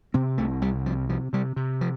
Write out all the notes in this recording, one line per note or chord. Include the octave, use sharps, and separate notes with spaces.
C3 C4
C2 A3
C2 G3
C3 F3
C3 F3
C3 G3
C3
F3